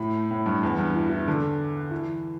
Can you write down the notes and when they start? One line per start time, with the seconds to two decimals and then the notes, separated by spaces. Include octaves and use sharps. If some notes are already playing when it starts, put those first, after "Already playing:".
Already playing: A2
0.31 A2
0.46 G2
0.63 E2
0.78 G2
0.95 E3
1.09 E3
1.28 D3
1.91 E3